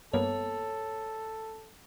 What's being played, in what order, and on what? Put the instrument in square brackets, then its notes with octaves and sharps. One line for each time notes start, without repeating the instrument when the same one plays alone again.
[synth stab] G2 A#3 B3 [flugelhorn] A4 [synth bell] C#5